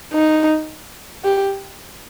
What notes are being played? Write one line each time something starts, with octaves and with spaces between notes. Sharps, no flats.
D#4
G4